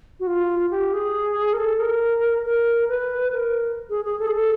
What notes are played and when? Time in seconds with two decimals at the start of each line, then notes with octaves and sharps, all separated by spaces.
0.20 F#4
0.27 F4
0.71 G4
0.93 G#4
1.53 A#4
1.58 A4
1.79 A#4
2.46 A#4
2.89 B4
3.32 A#4
3.90 G#4
4.05 G#4
4.19 A4
4.27 G#4
4.35 A4